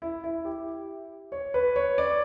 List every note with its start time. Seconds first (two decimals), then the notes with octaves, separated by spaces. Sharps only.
0.02 E4
0.24 E4
0.45 G4
1.32 C#5
1.54 B4
1.76 C#5
1.98 D5